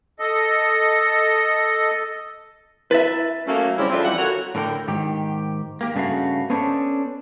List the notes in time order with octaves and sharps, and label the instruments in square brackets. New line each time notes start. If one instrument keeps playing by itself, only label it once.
[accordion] A4 D#5
[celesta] E4 A6 [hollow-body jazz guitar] B4 E5
[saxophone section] F#3 A3 A#3 C#4
C#3 G3 C4 C#4 E4
F2 C4 D4 F4 E5
E3 G3 F#5
D3 F#4 A#4 C#5
[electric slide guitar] A2 D3 A#4 F#5 G5
G#2 D#3 G4
A#3 G4
G2 C#3 A3 F#4 F5
B3 C#4 D4 A4 C5